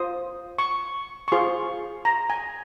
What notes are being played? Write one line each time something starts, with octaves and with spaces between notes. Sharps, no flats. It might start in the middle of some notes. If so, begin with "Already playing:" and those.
Already playing: F4 C5 D#6
C#6
C#6
F4 G#4 C5 C6
A#5
G#5